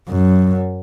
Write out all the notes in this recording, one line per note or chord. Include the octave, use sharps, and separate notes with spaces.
F#2